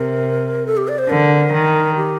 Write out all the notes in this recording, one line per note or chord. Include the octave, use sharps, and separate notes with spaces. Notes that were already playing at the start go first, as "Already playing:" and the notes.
Already playing: C3 A#4
A4
G4
D5
C5
D3 A#4
D#3
G4